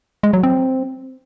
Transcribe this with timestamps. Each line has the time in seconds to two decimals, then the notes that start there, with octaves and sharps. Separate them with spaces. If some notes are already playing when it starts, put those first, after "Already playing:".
0.23 G#3
0.33 F#3
0.43 C4